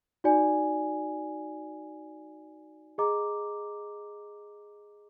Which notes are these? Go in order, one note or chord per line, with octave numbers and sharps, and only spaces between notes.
D#4 F#4 D5 G#5
G#4 D#5 A#5 D6